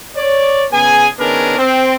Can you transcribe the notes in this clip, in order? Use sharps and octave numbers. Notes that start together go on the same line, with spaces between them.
C#5 D5
C#3 B3 G#4 G#5
D#3 B3 C#4 D4 G#4 A#4
C4